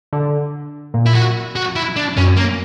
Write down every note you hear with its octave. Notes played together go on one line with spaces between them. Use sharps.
D3
A#2
E4
F#4
F#4
E4
D4
F#2 C#4
A#3